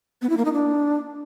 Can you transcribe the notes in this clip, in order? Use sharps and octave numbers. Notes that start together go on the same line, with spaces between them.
B3
E4
A#3
D#4
D4